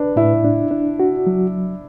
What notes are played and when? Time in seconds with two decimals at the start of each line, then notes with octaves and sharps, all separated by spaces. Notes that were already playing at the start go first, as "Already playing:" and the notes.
Already playing: D4 B4
0.16 A2 E4
0.45 D4
0.71 D4
1.00 F#4
1.27 F#3